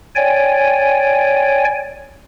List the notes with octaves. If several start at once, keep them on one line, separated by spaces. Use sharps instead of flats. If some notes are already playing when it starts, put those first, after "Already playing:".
C#5 D5 G5 G#5